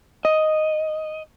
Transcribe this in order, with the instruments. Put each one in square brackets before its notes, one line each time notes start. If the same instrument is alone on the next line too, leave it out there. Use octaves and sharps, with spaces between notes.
[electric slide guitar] D#5